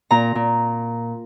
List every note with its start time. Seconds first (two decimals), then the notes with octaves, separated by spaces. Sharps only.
0.11 A#2 A#5
0.35 A#2